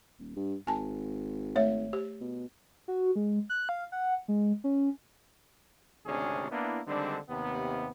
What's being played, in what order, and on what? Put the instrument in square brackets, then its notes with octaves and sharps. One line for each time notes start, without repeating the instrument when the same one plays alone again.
[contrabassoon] D#1
G2
[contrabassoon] G#1 [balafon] G#5 A5
[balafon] A3 C#5 E5
G4
[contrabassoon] B2
[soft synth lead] F#4
G#3
F#6
F5
F#5
G#3
C#4
[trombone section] G#1 D2 C3 C#4 D4 G#4
A#3 B3 D4 E4
D3 D#3 G3 G#3 C4 D4
D#2 C3 B3